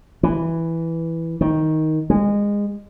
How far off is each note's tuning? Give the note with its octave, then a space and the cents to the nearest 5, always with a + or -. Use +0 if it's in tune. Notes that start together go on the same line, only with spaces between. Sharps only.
E3 +0
D#3 +10
G#3 -25